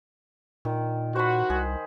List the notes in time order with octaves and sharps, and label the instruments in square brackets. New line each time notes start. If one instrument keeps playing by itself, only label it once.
[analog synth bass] A#2 [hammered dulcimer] D#3
[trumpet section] F#4 [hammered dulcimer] C5 B5
[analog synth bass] C2 [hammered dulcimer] G#4